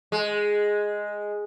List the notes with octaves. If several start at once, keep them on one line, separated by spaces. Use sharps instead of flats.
G#3